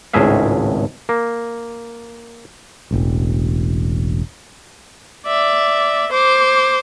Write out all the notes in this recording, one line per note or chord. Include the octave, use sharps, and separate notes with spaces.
G#1 C#2 A2 G#4 E5 F5
A#3
E1 A1
D5 E5
C5 D6